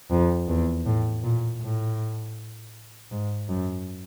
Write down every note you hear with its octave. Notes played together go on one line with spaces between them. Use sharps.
F2
E2
A2
A#2
A2
G#2
F#2